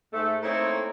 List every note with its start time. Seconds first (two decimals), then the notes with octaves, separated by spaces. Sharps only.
0.12 G#2 A3
0.43 A3 A#3 C4 D#4 E4 C#5